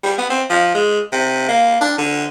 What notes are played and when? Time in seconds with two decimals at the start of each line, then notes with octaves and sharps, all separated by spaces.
0.03 G3
0.18 B3
0.30 C4
0.50 F3
0.74 G#3
1.12 C3
1.48 A#3
1.81 D4
1.98 D3